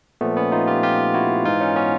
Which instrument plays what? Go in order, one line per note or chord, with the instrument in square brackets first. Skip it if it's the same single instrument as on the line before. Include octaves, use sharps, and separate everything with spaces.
[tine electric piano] A#2 F3 A3 B3
B3 C#4
D#4 F4
F4 G4
F4 G4
E4 F#4
G#2 E3 D#4 F4
C#4 D#4
B3 C#4